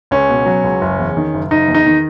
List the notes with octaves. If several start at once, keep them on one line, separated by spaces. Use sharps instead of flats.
C#2 C#4
B2
F#3
C#2
F#1
E2
D#3
F#1
F#1 D#4
E2
D#4
D#3